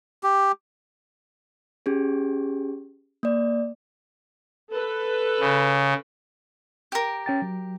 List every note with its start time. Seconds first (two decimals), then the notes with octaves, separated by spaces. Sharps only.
0.23 G4
1.86 C#4 G4 G#4
3.23 A#3 D5
4.71 A4 B4
5.40 C#3
6.92 G4 A#4
7.26 C#4 G5 A6
7.42 F#3